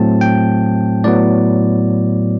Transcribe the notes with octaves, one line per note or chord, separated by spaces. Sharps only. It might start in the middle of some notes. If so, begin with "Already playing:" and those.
Already playing: A2 F#3 A3 C4 A5
G5
A2 F#3 B3 D5